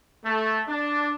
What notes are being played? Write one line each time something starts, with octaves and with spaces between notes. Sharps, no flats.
A3
D4